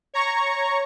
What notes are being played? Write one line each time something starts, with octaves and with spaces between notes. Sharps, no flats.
C#5 A#5 C#6